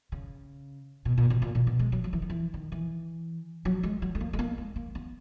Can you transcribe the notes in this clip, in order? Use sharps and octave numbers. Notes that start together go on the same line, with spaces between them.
C#3
B2
A#2
B2
A#2
A#2
B2
G#3
F#3
F#3
E3
D#3
E3
D#3
E3
F#3
G#3
F#3
G#3
A#3
G#3
A#3
G#3
A#3
B3